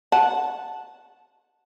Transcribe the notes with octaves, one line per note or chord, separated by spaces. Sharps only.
F#5 A5